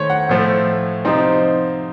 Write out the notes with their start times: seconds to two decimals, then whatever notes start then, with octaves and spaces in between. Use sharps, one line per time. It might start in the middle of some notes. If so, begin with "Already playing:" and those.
Already playing: D#3 A3 C5 C#5
0.10 F#5
0.29 A2 F3 A3
1.05 C3 F3 C4 D#4